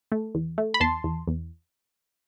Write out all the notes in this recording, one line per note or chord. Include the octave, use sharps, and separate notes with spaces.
A3
E2
A3
B5
E2 A5 C6
E2
E2